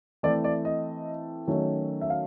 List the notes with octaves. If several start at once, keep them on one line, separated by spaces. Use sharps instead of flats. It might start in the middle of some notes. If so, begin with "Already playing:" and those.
E3 A3 C4 E4 D5
D5
D#5
D#3 F#3 A3 C#4
E5
F5